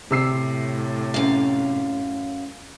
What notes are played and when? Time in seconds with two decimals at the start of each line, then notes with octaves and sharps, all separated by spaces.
0.11 A2 C3 E6 C7
1.14 F#2 F5